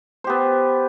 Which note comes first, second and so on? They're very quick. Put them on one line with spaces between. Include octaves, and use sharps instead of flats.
C5 G4 B3